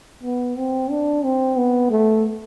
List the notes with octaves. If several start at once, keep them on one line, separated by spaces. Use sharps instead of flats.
B3
C4
D4
C4
B3
A3